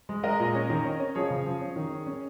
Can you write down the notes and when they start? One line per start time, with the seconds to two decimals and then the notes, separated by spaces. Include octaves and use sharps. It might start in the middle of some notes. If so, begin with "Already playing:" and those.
0.09 G#3
0.23 G#3 A#4 D#5
0.40 A#2
0.55 C#4
0.70 D#3
0.85 C#4
1.00 C#4
1.15 F3 G#4 C#5
1.30 C#3
1.46 F3
1.61 C#4
1.76 D#3
1.91 C#4
2.06 C#4